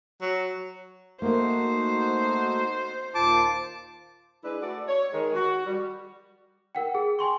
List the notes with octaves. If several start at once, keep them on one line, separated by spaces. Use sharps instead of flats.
F#3
A3 A#3 D#4 F#4 C5
D#2 A#2 F4 A5 D6
G#3 D4 E4 B4
A3 F#4 A4 D5
C#5
D#3 G#3
F#4
G3
A#4 F#5 G5
G#4
G5 G#5 C6 C#6